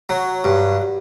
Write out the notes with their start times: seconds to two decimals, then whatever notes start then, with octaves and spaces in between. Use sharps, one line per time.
0.09 F#3
0.44 G2